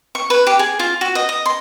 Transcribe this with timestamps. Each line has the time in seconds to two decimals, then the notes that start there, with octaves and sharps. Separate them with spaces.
0.15 C#6
0.30 B4
0.47 G4
0.59 G#4
0.79 F4
1.01 F#4
1.15 D#5
1.29 D#5
1.46 C6